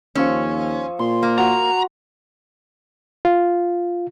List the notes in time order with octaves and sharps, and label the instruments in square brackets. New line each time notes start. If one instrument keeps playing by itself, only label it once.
[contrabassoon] D#2 [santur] F3 C#6 E6 [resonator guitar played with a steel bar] C#4
[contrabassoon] A#2 [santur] C6
[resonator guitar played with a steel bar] A#3
[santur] F#4 [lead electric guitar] A#5
[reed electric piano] F4